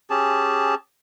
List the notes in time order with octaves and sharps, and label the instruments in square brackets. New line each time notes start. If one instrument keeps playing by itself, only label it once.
[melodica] C#4 G4 G#4 A5